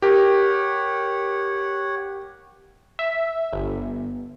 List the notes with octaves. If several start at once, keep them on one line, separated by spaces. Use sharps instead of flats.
G4 A#4 C#5 F#5
E5
G1